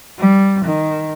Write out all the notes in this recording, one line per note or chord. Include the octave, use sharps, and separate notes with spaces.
G3
D#3